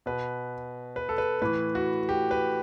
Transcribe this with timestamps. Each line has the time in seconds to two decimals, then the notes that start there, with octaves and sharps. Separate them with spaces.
0.06 B2 B4
0.96 B4
1.09 A4
1.18 B4
1.42 A2 E3 B4
1.75 F#4
2.09 G4
2.31 B4